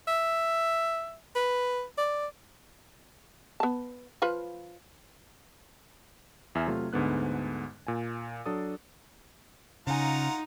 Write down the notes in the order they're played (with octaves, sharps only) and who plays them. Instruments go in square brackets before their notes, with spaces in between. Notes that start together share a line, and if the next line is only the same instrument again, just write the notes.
[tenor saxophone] E5
B4
D5
[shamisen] B3 A5
F3 F4 B4
[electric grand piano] E2 E5 G#5 F6 G#6
C3 F#3 A3 F4
D2 G#2 D3 B3 F#6
A#2 G#5
F#3 D4 A4 D#6
[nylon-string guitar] C#3 G#5 [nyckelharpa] D#4 [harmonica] F4 F#5 A#5